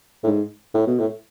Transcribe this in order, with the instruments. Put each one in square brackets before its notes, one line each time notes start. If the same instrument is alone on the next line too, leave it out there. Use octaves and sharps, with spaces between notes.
[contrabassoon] A2
G#2
A2
B2
A2